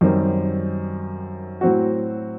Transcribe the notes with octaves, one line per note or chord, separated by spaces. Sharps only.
F#2 D#3 G3 C4
A2 F#3 C4 F#4